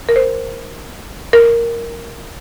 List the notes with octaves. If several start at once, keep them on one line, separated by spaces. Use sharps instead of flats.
A#4
C5
A#4